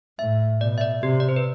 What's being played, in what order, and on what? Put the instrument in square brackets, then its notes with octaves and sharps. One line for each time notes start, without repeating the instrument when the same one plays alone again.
[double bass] A2 [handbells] E5
[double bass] B2 [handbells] D5
[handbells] E5
D5
[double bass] C3 [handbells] G4
[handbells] D5
C5
B4